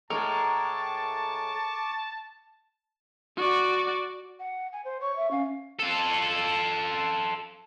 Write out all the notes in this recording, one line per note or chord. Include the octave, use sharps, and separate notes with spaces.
A2 G#3 A#4 A5 C#6 D6
F#4 D5
F#5
G#5
C5
C#5 C#6
E5
C#4 F5
F4 A4